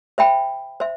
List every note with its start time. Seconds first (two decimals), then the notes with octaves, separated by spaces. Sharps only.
0.18 C5 E5 G5 B5
0.80 C5 E5